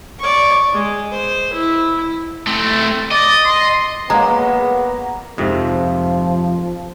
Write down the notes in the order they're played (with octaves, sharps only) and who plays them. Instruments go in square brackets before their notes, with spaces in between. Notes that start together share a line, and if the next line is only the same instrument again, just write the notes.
[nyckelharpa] D5 C#6
G#3
C5
E4
[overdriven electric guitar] A3 C4
[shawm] D5 [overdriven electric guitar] D#5
[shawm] C6
[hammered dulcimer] F#3 A#3 [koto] G#3 [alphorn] B3 [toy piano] A#5
[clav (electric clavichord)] F2 G#2 C3 [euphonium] F3